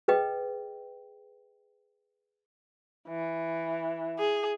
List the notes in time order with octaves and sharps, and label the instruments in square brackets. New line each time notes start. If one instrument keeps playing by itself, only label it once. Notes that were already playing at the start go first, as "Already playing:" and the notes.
[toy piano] G#4 B4 D#5 G5
[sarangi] E3
[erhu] G#4